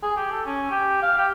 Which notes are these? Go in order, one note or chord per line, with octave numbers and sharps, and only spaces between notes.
G#4
G4
A4
C#4
G4
F5
G4